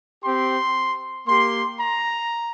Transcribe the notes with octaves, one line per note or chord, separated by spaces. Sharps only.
C4 G4 C6
A#3 G4 C6
A#5